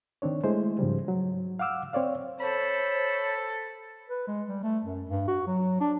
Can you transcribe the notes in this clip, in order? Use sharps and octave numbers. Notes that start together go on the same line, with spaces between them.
D#3 C4 D4 C#5
G#3 A3 E4 C5
G#2 C#3 F3 G3
F#3
F5 F#5 D6 E6 F6
C4 C#5 D5 F5
A4 C5 C#5 B5
B4
G#3
G3
A3
F#2
G2
F#4
F#3
D4